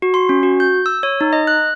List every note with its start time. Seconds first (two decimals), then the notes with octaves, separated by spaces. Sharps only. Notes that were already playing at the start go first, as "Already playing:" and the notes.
0.02 F#4
0.14 C6
0.29 C#4
0.43 F#4
0.60 G6
0.86 E6
1.03 C#5
1.21 D#4
1.33 D#5
1.47 F#6